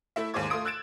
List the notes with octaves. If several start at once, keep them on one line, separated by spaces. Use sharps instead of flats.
A3 E4 E5
D#2 G#2 G#3 C5 D6 G#6
A3 F4 C6 D#6 D7
E6 F#6 G#6 A6 D7 E7